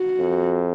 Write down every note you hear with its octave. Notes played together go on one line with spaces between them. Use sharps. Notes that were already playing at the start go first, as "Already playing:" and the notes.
Already playing: F#4
F2